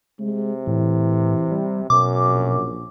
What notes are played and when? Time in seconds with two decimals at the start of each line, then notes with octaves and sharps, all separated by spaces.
0.20 C3 G#3
0.67 A2 E3
1.51 G3
1.90 F#2 B2 D6
2.28 A#1